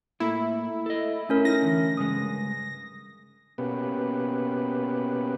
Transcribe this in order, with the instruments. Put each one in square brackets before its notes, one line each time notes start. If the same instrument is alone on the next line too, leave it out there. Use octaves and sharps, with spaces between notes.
[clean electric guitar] A2 A#3 A4 [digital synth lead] E4
[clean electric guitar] A4 D#5
[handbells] A3 C#4 A#4
[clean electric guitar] D#4 [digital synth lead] A#6
[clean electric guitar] D3 E3
[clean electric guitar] G2 C#3 G#3 [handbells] D#6
[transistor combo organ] B2 A#3 B3 C#4 G4 B4